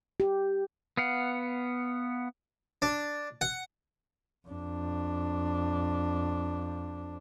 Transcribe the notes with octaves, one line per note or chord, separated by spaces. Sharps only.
G4
B3 F5 F#5
D4
F#5
F2 D4